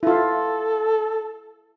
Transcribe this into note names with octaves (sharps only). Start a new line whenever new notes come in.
E4 F4 A4